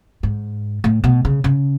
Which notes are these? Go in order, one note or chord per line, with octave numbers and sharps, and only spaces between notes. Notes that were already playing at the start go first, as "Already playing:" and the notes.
G#2
A2
B2
C#3
C#3